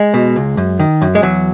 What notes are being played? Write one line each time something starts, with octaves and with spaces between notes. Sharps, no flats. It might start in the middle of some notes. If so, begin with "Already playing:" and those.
Already playing: G#3
B2
C#2
F#2
D#3
F#2
G#3
E2 F#3